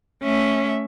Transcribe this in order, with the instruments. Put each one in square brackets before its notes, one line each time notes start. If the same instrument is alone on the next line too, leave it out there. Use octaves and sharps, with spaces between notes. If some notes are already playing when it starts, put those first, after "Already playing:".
[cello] A3 E5 [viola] C#4